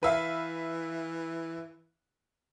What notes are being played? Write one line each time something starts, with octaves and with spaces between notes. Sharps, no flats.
E3 B4 E5 F5